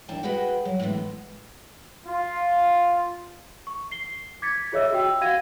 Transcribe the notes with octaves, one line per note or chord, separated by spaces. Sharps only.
D#2 E3 D4 G5 A5
F#4 G#4 B4 D#5 F#5 G5
F#3
A2 D3 E3 G#3 B3
F4
C#6
C7 G7
D6 G#6 A6 B6 C#7
F4 G#4 C#5 D#5 E5 E6
F#4 G5 E6
F#4 F5 F#5 G#6 A#6 D#7